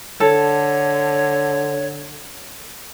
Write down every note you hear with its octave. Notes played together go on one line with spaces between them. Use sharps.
D3 A4 C#5